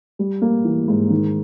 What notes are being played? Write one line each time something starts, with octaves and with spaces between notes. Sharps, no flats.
G3
A#3
E3
G#2
D#3